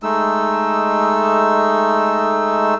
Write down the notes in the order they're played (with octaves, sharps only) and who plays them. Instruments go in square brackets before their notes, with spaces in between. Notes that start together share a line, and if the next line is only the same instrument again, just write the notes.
[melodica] G#3 A3 D#4 E6